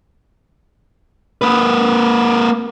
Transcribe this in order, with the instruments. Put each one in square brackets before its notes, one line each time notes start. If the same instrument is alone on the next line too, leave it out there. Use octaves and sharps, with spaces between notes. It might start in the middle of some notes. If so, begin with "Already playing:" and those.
[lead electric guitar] A#3 B4